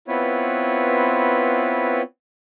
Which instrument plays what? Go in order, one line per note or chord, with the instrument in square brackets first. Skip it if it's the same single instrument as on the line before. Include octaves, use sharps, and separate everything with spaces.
[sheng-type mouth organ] B3 C4 E4 F4 B4 C#5